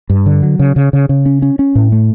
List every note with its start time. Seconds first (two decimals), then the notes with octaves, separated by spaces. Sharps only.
0.09 G2
0.26 D3
0.43 F#3
0.59 C#3
0.76 C#3
0.93 C#3
1.09 C#3
1.26 C#4
1.42 C#4
1.59 C#4
1.75 A2
1.92 A3